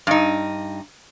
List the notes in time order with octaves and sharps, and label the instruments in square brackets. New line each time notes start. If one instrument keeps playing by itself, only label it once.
[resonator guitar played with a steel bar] G2 D#4